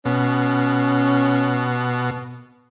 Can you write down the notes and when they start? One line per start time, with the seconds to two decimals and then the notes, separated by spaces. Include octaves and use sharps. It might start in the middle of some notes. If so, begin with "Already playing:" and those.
0.05 B2 C#4